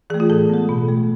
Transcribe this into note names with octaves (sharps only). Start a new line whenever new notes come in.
E3 A3 G#4
F4
A2 A4
G#3 B3
B2
A3